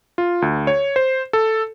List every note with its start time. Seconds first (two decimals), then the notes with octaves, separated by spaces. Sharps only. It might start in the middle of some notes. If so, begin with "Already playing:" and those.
0.18 F4
0.42 D2
0.67 C#5
0.96 C5
1.33 A4